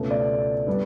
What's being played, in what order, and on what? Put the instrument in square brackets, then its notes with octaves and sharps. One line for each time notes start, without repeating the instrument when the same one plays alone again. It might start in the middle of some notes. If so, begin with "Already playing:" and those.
Already playing: [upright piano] C#2 B2 A3 C#4
D5
G3 B3 D4